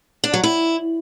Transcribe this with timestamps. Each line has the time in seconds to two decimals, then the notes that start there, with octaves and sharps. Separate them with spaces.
0.24 D4
0.34 F#3
0.43 E4